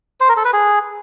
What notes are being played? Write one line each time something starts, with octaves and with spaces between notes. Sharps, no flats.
C5
A#4
A4
B4
G#4